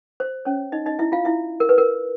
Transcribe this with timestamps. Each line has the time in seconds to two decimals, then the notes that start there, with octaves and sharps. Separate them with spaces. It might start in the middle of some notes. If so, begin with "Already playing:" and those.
0.20 C5
0.45 C#4 C#5
0.72 D#4 D#5
0.86 D#4 D#5
0.99 E4 E5
1.12 F4 F5
1.25 E4 E5
1.60 A#4
1.69 B4
1.78 A#4